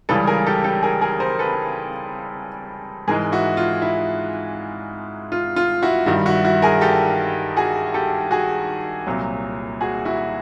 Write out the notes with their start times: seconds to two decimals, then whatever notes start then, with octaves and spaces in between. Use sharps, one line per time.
0.09 C#2 C#3 E3 G3 A4 B4
0.27 G#4 A#4
0.46 G4 A4
0.64 G4 A4
0.83 G#4 A#4
1.01 G#4 A#4
1.20 A#4 C5
1.39 A4 B4
3.08 G#2 E3 G#3 G#4 A#4
3.32 E4 F#4
3.57 F4
3.82 E4
5.32 F4
5.56 F4
5.83 E4 F#4
6.06 G2 D#3 G3 E4 F#4
6.26 E4 F#4
6.45 E4 F#4
6.62 G#4 A#4
6.81 G4 A4
7.57 F#4 G#4
7.94 G4 A4
8.31 F#4 G#4
9.07 C2 A#2 F#3
9.81 F#4 G#4
10.05 E4 F#4